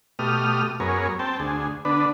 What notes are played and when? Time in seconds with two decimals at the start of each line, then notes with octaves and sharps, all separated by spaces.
0.19 B2 A3 G4 D#6 F6
0.80 F#2 B3 G#4 A#4 C#5
1.19 C4 G5 A5
1.40 D2 G#4
1.85 D3 B3 D4 B4